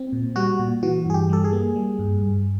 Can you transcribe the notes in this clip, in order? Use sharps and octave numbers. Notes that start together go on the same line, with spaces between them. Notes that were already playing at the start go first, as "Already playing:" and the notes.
Already playing: C4
A#2
G3 F#4
A#2
E3 F#4
G2 G#4
G4
G3 A4
G#4
A#3
G3
G2
G2